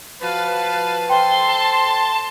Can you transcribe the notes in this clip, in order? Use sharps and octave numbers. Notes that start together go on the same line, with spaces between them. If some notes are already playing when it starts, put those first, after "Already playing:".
F3 F#4 B4 F5 A5
A4 C5 G5 C6
A5